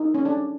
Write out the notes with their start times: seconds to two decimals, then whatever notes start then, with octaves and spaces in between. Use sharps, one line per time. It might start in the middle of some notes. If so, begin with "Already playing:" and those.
Already playing: D#4
0.14 C#4
0.25 D4